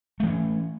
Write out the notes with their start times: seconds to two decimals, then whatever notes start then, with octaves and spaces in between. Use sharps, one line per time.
0.20 A3
0.23 E3
0.27 C#4